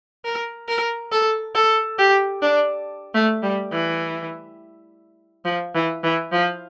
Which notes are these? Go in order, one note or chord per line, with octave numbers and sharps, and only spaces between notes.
A#4
A#4
A4
A4
G4
D4
A3
G3
E3
F3
E3
E3
F3